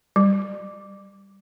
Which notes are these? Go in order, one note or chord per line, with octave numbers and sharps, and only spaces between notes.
G3